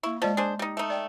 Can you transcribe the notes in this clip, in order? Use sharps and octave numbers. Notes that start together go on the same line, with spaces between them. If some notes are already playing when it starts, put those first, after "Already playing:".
A#3 E4 C#6
F3 G#3 D5 A5
D4 G#4 C5
G3 D#4
A3 D#4
D5 G5